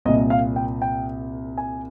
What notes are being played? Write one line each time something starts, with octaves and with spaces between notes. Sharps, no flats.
C2 A#2 D#5
F5
G5
G5
G#5